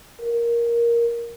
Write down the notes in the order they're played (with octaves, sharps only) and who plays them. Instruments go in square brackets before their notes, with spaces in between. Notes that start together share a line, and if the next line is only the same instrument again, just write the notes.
[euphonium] A#4